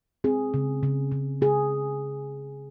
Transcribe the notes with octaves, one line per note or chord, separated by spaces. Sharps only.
C4 G#4
C#3
C#3
C#3
C#3 G#4